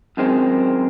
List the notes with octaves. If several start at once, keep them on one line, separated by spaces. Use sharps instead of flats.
F#2 D#3 G#3 C4